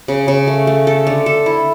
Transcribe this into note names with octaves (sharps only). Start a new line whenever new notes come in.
C#3
C#3
A3
A3
A4
D3
A4
E4